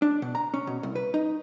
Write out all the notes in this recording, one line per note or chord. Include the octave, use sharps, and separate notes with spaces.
D4
B2
A#5
C#4
B2
C2
B4
D#4